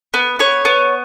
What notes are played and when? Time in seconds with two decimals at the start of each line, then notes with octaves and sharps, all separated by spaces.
0.14 B3
0.39 B3 C#5
0.65 B3